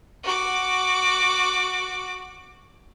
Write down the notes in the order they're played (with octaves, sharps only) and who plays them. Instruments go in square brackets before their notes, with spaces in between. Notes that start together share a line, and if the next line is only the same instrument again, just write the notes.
[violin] F#4 D6